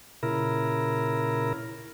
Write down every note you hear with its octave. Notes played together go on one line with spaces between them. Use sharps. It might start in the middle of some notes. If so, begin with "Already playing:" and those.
A#2 C#3 E4 A#4